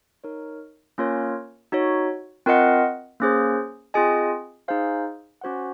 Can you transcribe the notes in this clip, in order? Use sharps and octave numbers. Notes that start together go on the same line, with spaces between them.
D#4 A#4 C#5
A#3 C#4 F4 A#4 C#5
D#4 F#4 C#5
C4 F4 A#4 D#5 F#5
A#3 C#4 G#4 C5
C4 F4 G#4 D#5 G#5
D#4 G#4 C5 F5 G#5
C#4 F#4 C5 F#5